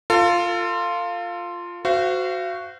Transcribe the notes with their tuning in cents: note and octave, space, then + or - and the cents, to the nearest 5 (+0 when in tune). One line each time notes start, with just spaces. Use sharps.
F4 +0 A4 +35
F#4 +0 C5 -25 F5 -40